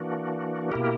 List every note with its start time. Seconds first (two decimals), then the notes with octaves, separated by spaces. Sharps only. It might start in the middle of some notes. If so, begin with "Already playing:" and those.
Already playing: E3 A#3 D4 F#4
0.72 B2 A#3 E4 G4 A#4